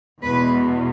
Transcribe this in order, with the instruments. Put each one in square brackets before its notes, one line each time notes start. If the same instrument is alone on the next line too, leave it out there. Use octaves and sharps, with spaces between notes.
[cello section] E2 B2 G#3 B4